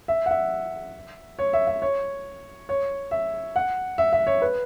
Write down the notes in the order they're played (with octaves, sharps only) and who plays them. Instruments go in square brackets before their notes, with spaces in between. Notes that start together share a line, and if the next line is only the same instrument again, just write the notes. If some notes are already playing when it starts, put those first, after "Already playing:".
[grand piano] E5
F#5
E5
C#5
E5
E5
C#5
C#5
E5
F#5
E5
E5
C#5
B4